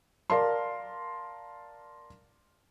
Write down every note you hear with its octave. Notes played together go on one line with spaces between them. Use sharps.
A#4 D5 F5 A5 C6